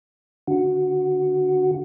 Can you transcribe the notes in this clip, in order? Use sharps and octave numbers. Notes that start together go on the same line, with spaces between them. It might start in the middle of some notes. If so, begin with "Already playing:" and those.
D3 F#4